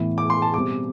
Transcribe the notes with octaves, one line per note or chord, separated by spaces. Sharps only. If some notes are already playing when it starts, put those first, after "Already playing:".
Already playing: A2 E3 B3 E4
D6
C6
A5
B2 G3 C4 D6